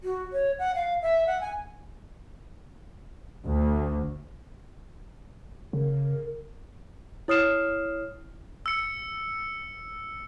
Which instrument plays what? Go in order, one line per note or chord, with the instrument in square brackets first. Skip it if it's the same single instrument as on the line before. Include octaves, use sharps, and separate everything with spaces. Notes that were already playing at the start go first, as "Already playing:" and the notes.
[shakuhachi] F#4
C#5
F#5
F5
E5
F#5
G#5
[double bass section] D2
[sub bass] C#3 [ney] A#4
[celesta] E4 C#5 D#6 F6 C7 E7
[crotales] E6 C#7